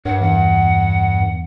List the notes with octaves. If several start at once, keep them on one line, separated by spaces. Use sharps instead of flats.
G2 D4 A#4 C#5 F#5
E2 F#5